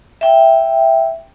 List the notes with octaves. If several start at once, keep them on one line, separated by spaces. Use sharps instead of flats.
E5 G5